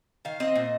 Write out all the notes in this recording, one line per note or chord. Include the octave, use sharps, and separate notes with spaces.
D#3 F5
C4 D#5
A#2